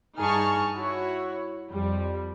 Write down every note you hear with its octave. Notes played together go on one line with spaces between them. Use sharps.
G2 D#4 G#4 A5 C#6 F6
E4 F#4 C#5
F2 G3